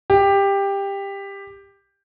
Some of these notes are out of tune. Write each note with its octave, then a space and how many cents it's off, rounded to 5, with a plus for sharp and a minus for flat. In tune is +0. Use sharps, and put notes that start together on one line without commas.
G4 +15